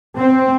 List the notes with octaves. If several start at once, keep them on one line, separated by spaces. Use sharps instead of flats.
C4